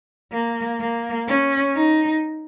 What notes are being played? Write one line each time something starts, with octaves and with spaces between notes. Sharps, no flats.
A#3
A#3
C#4
D#4